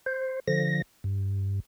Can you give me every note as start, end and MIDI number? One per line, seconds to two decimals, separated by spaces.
0.06 0.40 72
0.48 0.82 50
0.48 0.82 53
0.48 0.82 94
1.04 1.60 43